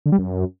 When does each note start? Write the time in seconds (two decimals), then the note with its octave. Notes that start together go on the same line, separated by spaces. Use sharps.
0.06 D3
0.12 G3
0.19 F#2